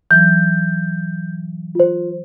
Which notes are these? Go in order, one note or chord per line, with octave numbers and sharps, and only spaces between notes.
E3 F#3 G6
F4 C5